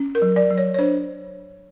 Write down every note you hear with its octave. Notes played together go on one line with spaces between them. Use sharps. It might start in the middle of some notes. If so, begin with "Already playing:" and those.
Already playing: C#4
A#4
F#3
D5
F#3
C#5
C#5
D4 C5